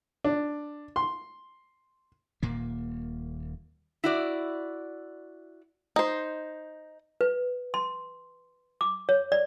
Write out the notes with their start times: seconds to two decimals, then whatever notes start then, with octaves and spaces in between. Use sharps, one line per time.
0.24 D4
0.96 C6
2.43 D#1 A#2 A#3
4.04 E4 F#4 D5
5.96 D#4 C5
7.21 B4
7.74 C6
8.81 D6
9.09 C#5
9.32 D5